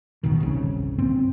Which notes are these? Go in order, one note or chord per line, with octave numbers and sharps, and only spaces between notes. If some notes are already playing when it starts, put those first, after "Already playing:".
F1 C2 B2 D#3
G1 C2 C#3
G2 C4